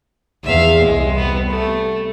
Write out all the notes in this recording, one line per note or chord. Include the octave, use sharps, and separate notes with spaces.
E2 E5 F5
C2 G#3
B3
A3